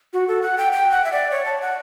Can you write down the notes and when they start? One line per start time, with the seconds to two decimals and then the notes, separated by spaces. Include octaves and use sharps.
0.13 F#4
0.28 A4
0.42 F#5
0.58 G5
0.73 G5
0.91 F#5
1.04 E5
1.12 D5
1.31 C#5
1.46 A5
1.61 F#5